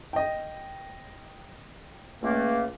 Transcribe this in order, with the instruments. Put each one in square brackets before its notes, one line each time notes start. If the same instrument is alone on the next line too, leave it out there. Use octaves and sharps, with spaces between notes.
[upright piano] D#5 G5
[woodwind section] C#2 A3 A#3